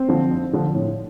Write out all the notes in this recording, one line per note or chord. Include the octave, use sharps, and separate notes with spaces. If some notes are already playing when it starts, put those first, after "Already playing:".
Already playing: C4
D3 F3
F2
D3 F3
A2